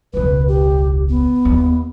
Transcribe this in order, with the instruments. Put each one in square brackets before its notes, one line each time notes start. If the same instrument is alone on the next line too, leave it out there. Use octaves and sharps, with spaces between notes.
[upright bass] E1 C#2 [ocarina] B4
[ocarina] G4
B3
[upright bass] D#2